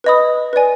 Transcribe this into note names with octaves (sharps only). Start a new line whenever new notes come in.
B4 D#5 B5 D#6
B4 D5 G#5